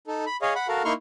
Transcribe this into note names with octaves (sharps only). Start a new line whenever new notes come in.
D#4 A4
B5
G#4 C#5 D#5 F5
F#5 B5
F#4 A4 A#4 F5
A#3 D#4 E4 C6 C#6 F6